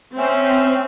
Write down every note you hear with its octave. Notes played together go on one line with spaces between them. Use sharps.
C4 C#4 E5 G#5